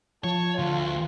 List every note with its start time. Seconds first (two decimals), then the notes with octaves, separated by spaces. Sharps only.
0.24 F3 C#5 A5
0.59 D2 F4